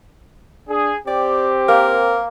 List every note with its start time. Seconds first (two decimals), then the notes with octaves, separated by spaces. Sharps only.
0.69 D4 G#4
1.08 C4 G4 D5
1.68 A#3 A#4 D6